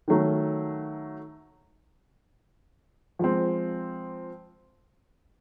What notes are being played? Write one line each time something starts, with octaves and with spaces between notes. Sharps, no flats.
D#3 F#3 A3
F3 G#3 C4